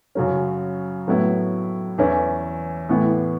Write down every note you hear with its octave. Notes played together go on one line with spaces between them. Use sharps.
F#2 C#3 F#3 C#4
A2 F#3 B3 E4
E2 E3 C#4 E4
A2 E3 B3 E4